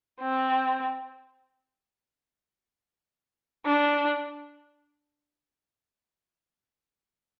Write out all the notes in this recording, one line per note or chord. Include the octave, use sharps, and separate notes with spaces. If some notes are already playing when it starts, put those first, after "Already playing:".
C4
D4